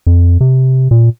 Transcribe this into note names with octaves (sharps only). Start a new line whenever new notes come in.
F2
C3
A#2